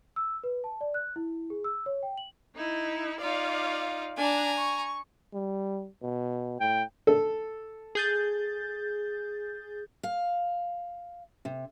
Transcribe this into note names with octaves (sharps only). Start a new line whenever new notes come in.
E6
B4
A5
D5
F#6
E4
G#4
E6
C#5
G5
F#7
D#4 E4
D#4 F4 D5 F5
D4 G#5 A#5
C#6
G3
B2
A2 G5
A4
G#4 G6 A6
F5
C3